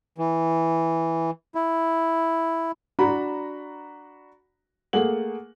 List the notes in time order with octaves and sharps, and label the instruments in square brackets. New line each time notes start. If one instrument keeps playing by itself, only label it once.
[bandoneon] E3
E4
[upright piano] D4 F#4 A#5 B5
A3 A#3 G#4 F#5 F#7